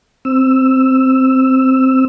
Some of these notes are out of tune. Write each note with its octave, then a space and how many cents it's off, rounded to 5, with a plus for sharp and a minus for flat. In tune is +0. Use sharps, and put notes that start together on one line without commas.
C4 +0 E6 +5